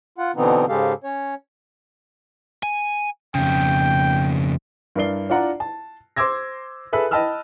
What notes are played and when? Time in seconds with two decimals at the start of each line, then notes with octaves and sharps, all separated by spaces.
0.18 F4 F#5
0.36 B2 D3 E3 B3 C4 D#4
0.69 G#2 C#3 G#3 G4 A4 F5
1.04 C#4 C#5
2.63 G#5
3.35 F2 C#3 G5
4.96 G2 E4 A#4 D5 C7 G7
5.30 D4 F4 D5 F#5 A#5
5.60 A5
6.17 C5 C6 D6 E6 G#6 A#6
6.93 G#4 A4 B4 E5 F#6
7.11 D#5 G5 A5 B5 E6 F6